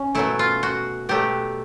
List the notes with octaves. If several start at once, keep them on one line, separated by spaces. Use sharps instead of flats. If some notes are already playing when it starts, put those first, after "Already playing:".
Already playing: C#4
B2 F#3 A3 E4
F4
F#4
B2 F#3 A3 G4